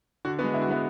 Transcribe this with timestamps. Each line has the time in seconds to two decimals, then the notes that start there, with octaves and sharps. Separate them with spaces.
0.25 D3 F#4
0.39 B3 F#4
0.43 G#3
0.53 D3 E4
0.62 F#4
0.68 G#3 B3 E4